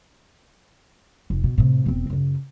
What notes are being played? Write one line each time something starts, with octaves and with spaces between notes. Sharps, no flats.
F1
B2
A2 C3
E1 C4
F#2 C#3